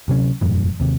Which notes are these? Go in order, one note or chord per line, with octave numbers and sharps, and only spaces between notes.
D2 C3 F#3 C#4
E1 F#2 A2 E3
D#2 C3